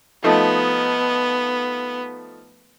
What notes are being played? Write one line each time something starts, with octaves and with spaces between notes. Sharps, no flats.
F3 A3 B3 D#4